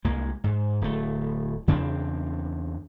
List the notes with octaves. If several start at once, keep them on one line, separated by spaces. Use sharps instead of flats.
C2 G#3 A#3
G#2
D1 A3
E2 C#3 C4 D4